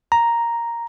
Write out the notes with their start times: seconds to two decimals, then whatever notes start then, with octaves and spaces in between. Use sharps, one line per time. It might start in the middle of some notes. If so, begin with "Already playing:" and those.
0.12 A#5